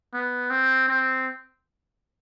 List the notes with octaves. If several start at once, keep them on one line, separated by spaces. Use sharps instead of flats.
B3
C4
C4